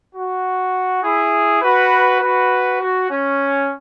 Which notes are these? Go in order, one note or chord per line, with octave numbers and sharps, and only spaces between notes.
F#4
E4 G#4
F#4 B4
F#4 B4
F#4
C#4